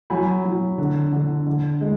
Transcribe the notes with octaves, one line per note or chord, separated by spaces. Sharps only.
F#3 G#5 B5
F#3
D3
D3
D3
G#3